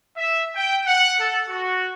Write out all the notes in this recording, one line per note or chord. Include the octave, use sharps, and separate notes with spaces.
E5
G5
F#5
A4
F#4